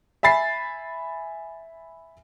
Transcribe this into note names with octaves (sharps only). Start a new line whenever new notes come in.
E5 G#5 B5 A6 C7